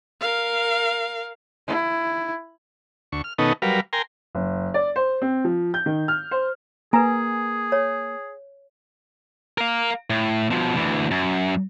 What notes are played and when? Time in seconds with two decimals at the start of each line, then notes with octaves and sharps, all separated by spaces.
0.21 A#4 F5
1.67 E4
3.12 D2 C#6
3.24 F6
3.38 B2 D#3 B3 C#4 D#4 A4
3.62 F#3 G3 A#4 B4 F5
3.93 A#4 G5 G#5 A#5 C6
4.35 F#1
4.74 D5
4.96 C5
5.22 C4
5.45 F3
5.74 G6
5.86 D#3
6.08 F6
6.31 C5
6.93 A#3 G#4 B4 G#5 A#5
7.72 C#5
9.58 A#4 F5
10.10 A2
10.50 B2 F3
10.77 D2 E3
11.11 F#2